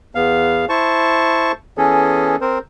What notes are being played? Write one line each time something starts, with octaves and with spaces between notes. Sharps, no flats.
E2 B3 F5
E4 C5 A5 C#6
E3 B3 C#4 G#4 A4
C4 A#4 C5